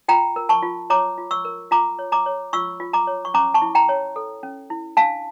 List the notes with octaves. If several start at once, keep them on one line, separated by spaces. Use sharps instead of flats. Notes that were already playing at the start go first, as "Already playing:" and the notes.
F4 G5 A#5
A#4
A5 C#6
F4
C#5 A#5 D6
F4
C#6 E6
A#4
F4 A#5 D6
C#5
A#5 D6
C#5
F4 C#6 E6
F4
A#5 D6
C#5
C#6
C#4 A#5 D6
A5 C#6
E4
G5 A#5
C#5
A4
C#4
E4
D4 F5 A5